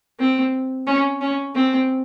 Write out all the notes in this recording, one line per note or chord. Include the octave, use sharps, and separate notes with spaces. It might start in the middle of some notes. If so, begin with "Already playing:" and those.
C4
C#4
C#4
C4